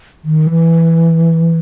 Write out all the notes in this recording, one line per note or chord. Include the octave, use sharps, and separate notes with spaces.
D#3
E3